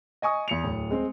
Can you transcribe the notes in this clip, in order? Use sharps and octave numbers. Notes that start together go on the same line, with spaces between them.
D#5 G#5 C#6 D#6
E2 C#7 F7
D1
G#3 C4